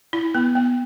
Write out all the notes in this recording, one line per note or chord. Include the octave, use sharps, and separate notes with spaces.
E4
B3
B3